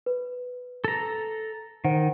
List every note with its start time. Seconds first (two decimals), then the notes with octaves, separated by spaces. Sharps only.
0.06 B4
0.84 A4 A#5
1.84 D#3 C5 F#5